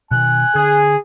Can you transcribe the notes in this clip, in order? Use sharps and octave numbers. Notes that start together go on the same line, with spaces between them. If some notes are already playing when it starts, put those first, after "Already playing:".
B2 D3 D#3 G#5 F#6
D3 G#4